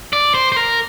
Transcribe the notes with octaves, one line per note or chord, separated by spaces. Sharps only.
D5
C5
C5
A#4